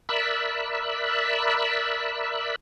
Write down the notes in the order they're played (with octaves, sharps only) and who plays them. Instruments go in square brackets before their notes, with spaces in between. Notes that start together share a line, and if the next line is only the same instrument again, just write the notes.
[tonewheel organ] A#4 D5 E5 B5 E6 F#6